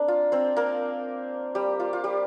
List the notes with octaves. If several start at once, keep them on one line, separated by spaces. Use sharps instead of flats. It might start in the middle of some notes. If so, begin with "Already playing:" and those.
Already playing: A#3 C4 D4 A#4
F4
C4 C5
A#3 A#4
G3 G4
F4
F4
G3 G4